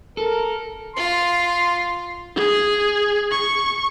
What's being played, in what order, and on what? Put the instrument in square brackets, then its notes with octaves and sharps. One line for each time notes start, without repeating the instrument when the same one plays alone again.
[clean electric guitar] A4 [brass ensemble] A#4
[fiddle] F4 [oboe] C6
[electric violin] G#4
C#6